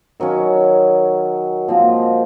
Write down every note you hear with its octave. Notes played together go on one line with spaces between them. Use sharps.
D#3 F#3 C#4
A#2 F3 G#3 C4